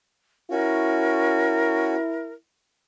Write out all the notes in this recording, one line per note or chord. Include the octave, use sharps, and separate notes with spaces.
C#4 E4 F#4 A#4